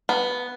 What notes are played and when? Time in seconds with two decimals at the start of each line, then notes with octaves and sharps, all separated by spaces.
0.09 B3